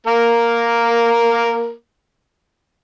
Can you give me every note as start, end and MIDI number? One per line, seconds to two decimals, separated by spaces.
0.07 1.72 58
0.07 1.72 70